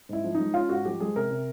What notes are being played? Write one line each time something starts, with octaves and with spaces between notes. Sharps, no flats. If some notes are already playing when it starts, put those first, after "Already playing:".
G#2 E4
F3
G#3 D#4
C#4 F4
G#2 F#4
F3 G4
G#3 G#4
C3 A#4
C3